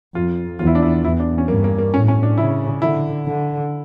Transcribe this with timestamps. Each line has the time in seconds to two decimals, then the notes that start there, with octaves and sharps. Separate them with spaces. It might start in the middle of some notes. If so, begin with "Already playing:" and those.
0.15 F2 F4
0.59 E2 F4
0.67 E4
0.75 D4
0.82 E4
1.04 E2 E4
1.20 D4
1.38 C#4
1.48 G2 A#3
1.64 A#3
1.78 A#3
1.94 A2 C#4
2.08 C#4
2.23 D4
2.38 C#3 E4
2.81 D3 E4
3.27 D3